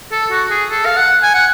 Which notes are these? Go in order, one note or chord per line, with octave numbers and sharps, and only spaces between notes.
A4
F#4
G#4
A4
F5
F#5
G#5
F#5